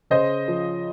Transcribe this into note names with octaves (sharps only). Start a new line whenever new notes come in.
C#3 C5 D#5
F3